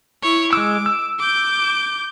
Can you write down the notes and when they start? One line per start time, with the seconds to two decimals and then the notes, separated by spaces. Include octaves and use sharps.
0.23 E4 C#5
0.53 G#3 D6 E6
0.86 E6
1.19 D6 G6